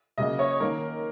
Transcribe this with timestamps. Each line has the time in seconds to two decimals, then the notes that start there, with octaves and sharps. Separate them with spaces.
0.18 C#3 F#3 A#3 D#5
0.39 C#5
0.60 D#3 A#3 A#4